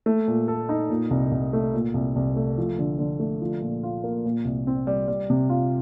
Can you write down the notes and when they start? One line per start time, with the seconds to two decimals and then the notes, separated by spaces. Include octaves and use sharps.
0.06 A3
0.28 A#2
0.48 A4
0.69 D#4
0.90 A#2
1.11 C2
1.32 C2
1.53 A3
1.74 A#2
1.94 C2
2.16 C2
2.36 A3
2.58 F3
2.79 D3
2.99 D3
3.20 A3
3.41 F3
3.62 A#2
3.83 F4
4.04 A#3
4.25 A#2
4.45 C2
4.67 C4
4.87 G3
5.08 G3
5.30 C3
5.49 F4